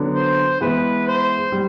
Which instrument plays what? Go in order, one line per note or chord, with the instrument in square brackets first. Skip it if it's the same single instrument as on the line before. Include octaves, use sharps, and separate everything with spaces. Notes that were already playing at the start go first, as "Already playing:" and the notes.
Already playing: [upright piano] D3 F#3 B3 D4
[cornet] C5
[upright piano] E3 G#3 B3 [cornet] B4
[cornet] C5
[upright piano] G3